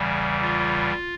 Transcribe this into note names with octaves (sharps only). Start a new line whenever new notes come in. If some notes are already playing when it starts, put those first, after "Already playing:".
Already playing: E2 C#3 E3 G3
F4